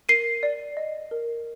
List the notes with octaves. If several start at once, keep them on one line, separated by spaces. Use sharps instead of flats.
A#4 C7 D#7
D5
D#5
A#4